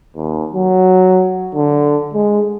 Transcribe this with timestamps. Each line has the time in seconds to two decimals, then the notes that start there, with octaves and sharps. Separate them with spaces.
0.15 D#2
0.54 F#3
1.55 D3
2.14 G#3